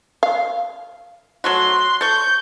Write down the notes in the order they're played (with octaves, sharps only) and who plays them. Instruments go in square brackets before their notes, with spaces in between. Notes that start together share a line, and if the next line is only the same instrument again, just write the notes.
[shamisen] F5
[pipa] F#3 A3 F#4 [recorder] C6
[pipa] A4 C#6 [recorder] G6